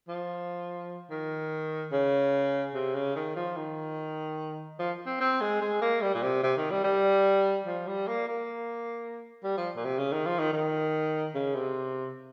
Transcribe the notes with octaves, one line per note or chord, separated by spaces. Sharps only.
F3
D#3
C#3
C3
C#3
D#3
F3
D#3
F3
C4
C4
G#3
G#3
A#3
G3
A#2
C3
C3
D#3
G3
G3
F3
G3
A#3
A#3
G3
F3
A#2
C3
C#3
D#3
F3
D#3
D#3
C#3
C3